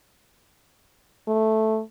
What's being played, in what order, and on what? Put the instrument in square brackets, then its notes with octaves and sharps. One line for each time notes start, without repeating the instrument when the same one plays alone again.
[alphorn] A3